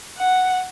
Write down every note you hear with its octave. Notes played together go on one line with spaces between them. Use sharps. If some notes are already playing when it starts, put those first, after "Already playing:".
F#5